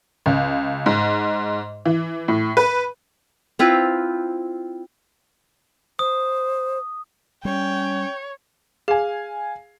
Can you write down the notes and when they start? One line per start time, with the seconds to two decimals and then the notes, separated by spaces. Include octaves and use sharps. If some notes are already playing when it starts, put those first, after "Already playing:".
0.26 C#2
0.86 G#2
1.86 E3
2.28 A2
2.57 B4
3.59 C4 E4 F4 B4
5.99 C5 D#6
7.45 G3 C#4 C#5 G5
8.88 G#4 F5 G#5